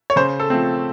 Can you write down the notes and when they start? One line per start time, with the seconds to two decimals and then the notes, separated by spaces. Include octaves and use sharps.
0.10 C#5
0.16 C#3 C5
0.40 A4
0.50 F3 A3 C4